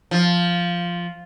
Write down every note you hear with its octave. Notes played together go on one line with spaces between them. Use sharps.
F3